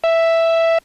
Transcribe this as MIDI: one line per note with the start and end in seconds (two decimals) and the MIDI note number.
0.04 0.78 76